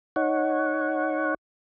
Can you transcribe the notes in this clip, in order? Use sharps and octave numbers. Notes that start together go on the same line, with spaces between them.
D#4 C#5 F#5